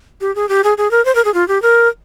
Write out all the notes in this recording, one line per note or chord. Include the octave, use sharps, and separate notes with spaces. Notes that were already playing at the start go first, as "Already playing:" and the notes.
G4
G#4
G4
G#4
G#4
A#4
C5
A#4
G#4
F4
G4
A#4